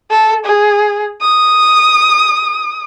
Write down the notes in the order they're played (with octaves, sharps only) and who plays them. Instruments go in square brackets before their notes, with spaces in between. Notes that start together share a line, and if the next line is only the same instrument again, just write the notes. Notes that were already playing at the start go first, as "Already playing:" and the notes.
[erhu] A4
G#4
D#6